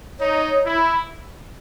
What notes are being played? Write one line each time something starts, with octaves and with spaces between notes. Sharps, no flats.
D#4 C#5
E4